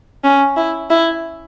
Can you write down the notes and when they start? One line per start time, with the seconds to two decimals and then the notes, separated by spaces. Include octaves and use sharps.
0.24 C#4
0.56 E4
0.90 E4